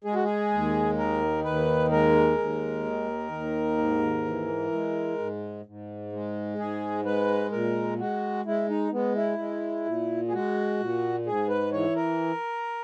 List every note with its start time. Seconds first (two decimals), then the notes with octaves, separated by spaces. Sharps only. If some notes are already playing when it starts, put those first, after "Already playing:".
0.04 G#3 G#4
0.14 F#4
0.24 G#4
0.51 D#2
0.98 D#3 A#4
1.44 D#2 B4
1.91 G#3 A#4
2.38 D#2
2.85 D#3
3.31 D#2
3.78 G#2
4.25 E3
4.72 G#3
5.19 G#2
5.65 G#2
6.12 G#3
6.58 G#2 G#4
7.05 G#3 B4
7.52 A#2 A#4
7.99 G#3 F#4
8.45 G#3 E4
8.69 D#4
8.92 G#3 B3
9.15 E4
9.38 G#3
9.86 A#2
10.28 G#4
10.32 G#3 F#4
10.79 A#2
11.26 G#2 G#4
11.49 B4
11.72 E3 C#5
11.96 A#4